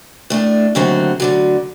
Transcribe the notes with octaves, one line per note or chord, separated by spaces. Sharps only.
A2 A3 D4
D#2 D3 F#3 A3 C4
D2 D3 F#3